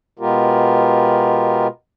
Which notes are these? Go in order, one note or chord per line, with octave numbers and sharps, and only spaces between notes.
B2 G#3 B3 F4 G4 A#4